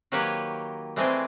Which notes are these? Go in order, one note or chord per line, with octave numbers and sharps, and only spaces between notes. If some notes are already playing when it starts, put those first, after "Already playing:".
D#3 F#3 A#3 G4 B4 C#5
E3 G#3 A3 C4 D5 D#5